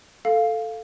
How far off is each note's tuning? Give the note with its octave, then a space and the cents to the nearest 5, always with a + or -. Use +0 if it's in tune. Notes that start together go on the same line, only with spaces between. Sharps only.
A4 +5 F5 +0